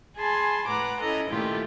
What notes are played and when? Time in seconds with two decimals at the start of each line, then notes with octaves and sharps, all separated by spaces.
0.16 G#4 G#5 A5 B5 C6
0.67 A2 B4 F#5 A#5 D6
1.00 C#4 E4 A4 D#5 A#5
1.29 A#2 D#3 A3 E4 F4 G4